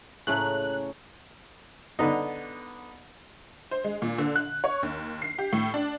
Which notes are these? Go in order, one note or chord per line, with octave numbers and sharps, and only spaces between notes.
A2 C#3 A3 C#4 A#5 F#6
D3 B3 D#4
C5
G#3
A#2
D3
F#6
C#5
D#2
C7
G4
A2
D4